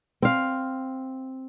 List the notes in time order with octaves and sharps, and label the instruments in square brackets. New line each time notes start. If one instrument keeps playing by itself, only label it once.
[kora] C4 F5